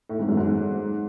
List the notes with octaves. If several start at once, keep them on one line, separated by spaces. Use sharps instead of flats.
A2
G#2
F#2
G#2